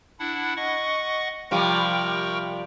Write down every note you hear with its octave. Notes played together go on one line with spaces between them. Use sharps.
D4 E4 F#5
D#5 F#5 C#6
C3 F3 G3 A#4 G5 C#6